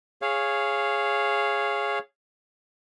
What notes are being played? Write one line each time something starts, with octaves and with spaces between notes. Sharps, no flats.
G#4 C#5 F5